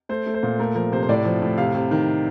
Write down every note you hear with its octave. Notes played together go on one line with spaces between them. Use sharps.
A3 C5
A3
C5
A#2
A3 A#4
F3 A#4
C3 C5
C5
A2 D5
F3
A2
C3 F5
C3
D#3